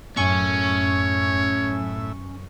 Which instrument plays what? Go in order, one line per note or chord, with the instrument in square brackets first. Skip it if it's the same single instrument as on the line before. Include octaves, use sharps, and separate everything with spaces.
[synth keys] F#2 C#6 [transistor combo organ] A2 E5 [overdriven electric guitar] C#4 G#5 [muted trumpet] C#5